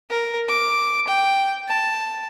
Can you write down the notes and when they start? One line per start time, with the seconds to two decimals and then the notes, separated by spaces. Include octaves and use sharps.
0.10 A#4
0.49 D6
1.08 G5
1.68 A5